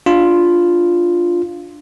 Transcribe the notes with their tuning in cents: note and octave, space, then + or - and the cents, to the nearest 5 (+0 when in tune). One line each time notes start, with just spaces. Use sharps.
D4 +0 F4 +0